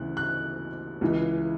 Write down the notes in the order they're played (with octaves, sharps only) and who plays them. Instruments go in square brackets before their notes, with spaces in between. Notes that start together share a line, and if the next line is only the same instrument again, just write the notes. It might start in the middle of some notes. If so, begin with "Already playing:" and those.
Already playing: [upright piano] D2 C#3 E3 F#6
F#6
C#2 C#3 E3